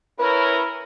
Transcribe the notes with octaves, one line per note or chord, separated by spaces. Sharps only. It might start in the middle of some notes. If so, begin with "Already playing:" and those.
C#4 E4 A#4 B4